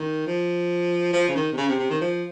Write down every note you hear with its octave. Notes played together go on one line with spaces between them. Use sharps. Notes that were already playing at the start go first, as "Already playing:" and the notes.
Already playing: D#3
F3
F3
C#3
D#3
C3
C#3
C3
C3
D#3
F3